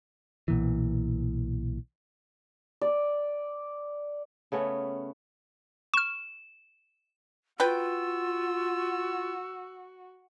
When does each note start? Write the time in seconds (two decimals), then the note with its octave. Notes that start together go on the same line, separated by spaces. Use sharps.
0.48 B1 A#2 E3
2.81 D5
4.52 C#3 A3 B3 C#4
5.94 C#6 F6 E7
7.60 F4 F#4 B4 G5 E6